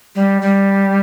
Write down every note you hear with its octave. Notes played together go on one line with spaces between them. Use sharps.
G3
G3